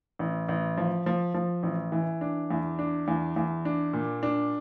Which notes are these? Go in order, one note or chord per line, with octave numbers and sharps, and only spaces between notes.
A1
A1
F3
F3
F3
A1
E3
D4
E2
D4
E2
E2
D4
A#2
D4